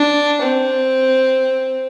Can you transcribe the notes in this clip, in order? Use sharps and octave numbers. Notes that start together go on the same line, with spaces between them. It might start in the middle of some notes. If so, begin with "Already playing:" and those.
Already playing: D4
C4